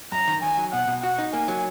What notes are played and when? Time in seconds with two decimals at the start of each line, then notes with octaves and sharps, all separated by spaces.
0.12 F#2 A#5
0.28 D#3
0.43 D#3 G#5
0.57 F#3
0.72 B2 F#5
0.88 B2
1.03 F#4 F#5
1.19 D#4
1.33 A#3 G#5
1.48 F#3